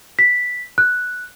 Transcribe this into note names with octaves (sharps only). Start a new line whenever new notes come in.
B6
F#6